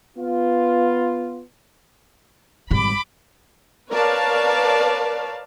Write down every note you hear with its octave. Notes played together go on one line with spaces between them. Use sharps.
B3 F4
G#1 G3 B5 D6
A#4 B4 C#5 D5 F5 A5